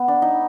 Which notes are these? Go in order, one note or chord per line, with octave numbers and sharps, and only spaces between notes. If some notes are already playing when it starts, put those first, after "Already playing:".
Already playing: B3
D4
D#4